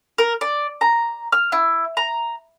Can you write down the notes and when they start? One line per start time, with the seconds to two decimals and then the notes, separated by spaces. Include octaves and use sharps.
0.18 A#4
0.41 D5
0.81 A#5
1.32 F6
1.52 E4
1.97 A#5